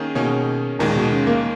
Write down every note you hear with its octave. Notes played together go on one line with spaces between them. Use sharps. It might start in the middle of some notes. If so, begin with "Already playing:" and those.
Already playing: D#3 A#3 C#4 G#4
B2 D#3 A#3 C#4 G#4 C#5
D#2 A#2 D#3 G#3
B2
C#3
A#3